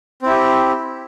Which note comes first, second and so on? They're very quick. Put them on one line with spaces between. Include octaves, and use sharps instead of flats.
C4 E4 G4